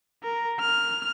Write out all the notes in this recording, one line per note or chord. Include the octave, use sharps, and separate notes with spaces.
A#4
F6